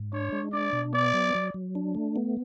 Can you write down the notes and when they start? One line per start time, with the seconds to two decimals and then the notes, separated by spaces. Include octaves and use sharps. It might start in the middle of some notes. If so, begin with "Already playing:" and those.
Already playing: G#2
0.13 D4 C#5
0.32 G#3
0.52 D4 D5
0.73 B2
0.93 B3 D5
1.14 F#3
1.35 F#3
1.54 F#3
1.75 D4
1.95 A3
2.16 B3